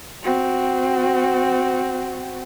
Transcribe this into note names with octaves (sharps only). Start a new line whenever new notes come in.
C4 F#4